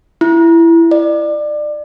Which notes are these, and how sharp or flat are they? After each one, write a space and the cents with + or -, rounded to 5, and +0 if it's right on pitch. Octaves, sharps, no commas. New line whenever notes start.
E4 +15
D5 +25